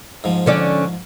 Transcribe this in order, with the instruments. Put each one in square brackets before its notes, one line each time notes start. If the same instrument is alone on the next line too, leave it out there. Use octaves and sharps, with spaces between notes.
[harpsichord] G#2 F3
[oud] D3 C#4 D5